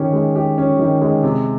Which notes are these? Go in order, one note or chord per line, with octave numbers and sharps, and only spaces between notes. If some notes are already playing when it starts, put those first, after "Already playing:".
Already playing: D#3 C#4 G4
G#3
G4
C#4
D#3
G#3
C3